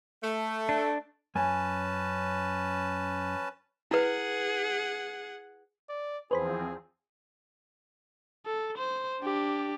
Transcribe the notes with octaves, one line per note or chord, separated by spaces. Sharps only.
A3
D4
F#2 C#4 B4 G#5 A5
E4 G#4 B4 F#5
D5
E2 F3 C4 G#4 B4 C5 B5
A4
C5
D4 G4